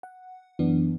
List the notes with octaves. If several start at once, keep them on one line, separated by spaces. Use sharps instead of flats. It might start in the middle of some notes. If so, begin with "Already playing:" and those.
F#5
F#2 E3 B3 D4